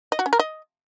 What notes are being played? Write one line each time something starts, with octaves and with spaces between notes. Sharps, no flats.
D#5
F#4
C#4
A#4
D#5